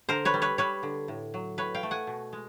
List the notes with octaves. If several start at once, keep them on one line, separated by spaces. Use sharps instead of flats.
D3 A#4 C5
B4 C#5
G3
B4 C#5
G3 B4 C#5
D3
A2
F#3
A2 B4 C#5
F5 G5
A3
F#5 G#5
B2
G#3